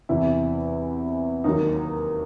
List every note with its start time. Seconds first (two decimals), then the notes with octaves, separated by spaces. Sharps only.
0.09 E2 C3 E3 E4
1.44 D#2 D#3 F#3 D#4